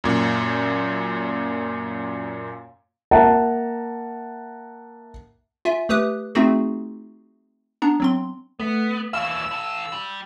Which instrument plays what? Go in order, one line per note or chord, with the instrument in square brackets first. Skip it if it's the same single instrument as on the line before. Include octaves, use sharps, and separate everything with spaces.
[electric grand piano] F#2 A#2
[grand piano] A#3 E5 F#5 A5 A#5
[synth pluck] F4 E5 G#5
A3 G4 B4 D#6 F#6
A3 C4 D#4 F4 F#4 G#4
B3 D4 A#5
F#3 C4 C6
[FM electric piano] A3 B6 [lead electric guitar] B3
[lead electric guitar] D#2 E3 [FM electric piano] F5 [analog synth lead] E6
[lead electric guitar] E3 A4
G3